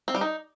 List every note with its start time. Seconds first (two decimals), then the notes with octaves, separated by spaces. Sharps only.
0.08 C4
0.15 G3
0.21 D#4